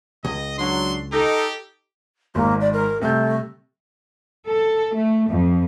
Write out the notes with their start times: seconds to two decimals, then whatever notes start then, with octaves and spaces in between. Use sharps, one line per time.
0.25 C#2 D#5
0.59 F#3 D4 C6
1.13 D#4 G4 A4
2.35 G#1 G#2 A#3
2.61 D5
2.73 A#4
3.02 C3 G3 A3 G6
4.46 A4
4.93 A3
5.29 F2